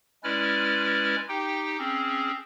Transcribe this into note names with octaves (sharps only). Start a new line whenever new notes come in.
G#3 C#4 E4 B4 D5 F6
D#4 G4 G5
C4 C#4 G#4